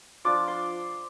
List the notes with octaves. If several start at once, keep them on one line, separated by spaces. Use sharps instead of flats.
F3 D4 F4 D6
C6